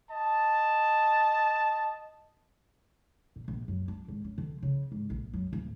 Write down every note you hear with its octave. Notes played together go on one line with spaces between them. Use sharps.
D#5 A5
A#2
A#1
F#2
D4
G#1
C#4
D3
C#3
G#2
A#1
F#2
D1